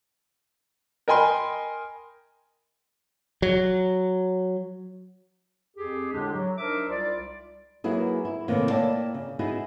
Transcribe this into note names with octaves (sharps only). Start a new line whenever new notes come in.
A#4 D#5 G5 G#5 B5 C6
F#3
F2 G4 G#4
A2 D3 G#3 D4 G4
F#3
D4 D#4 A#4 C5 E5 D6
C2 G3 F4 D5
F#3 A#3 B3 E4 G#4
E4
A2 C3 D#3 A#3 B4
A#3 E4 C#5 D5 G5 A5
C#3
B3 D#4 E4 F#4 G#4